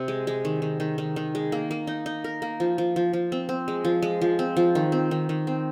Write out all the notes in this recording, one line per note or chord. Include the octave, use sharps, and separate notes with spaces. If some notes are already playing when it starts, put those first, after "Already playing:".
Already playing: C3
G#3
G#3
D#3
D#3
D#3
D#3
D#3
G#3
A#3
A#3
D#4
D#4
A#4
A#3
F3
F3
F3
F3
C4
C4
G#3
F3
G#3
F3
C4
F3
D#3
C4
D#3
D#3
C4